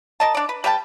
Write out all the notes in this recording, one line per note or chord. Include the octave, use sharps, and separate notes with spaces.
A#4 D#5 A5
D4 D5
B4
G3 B4 G5 A5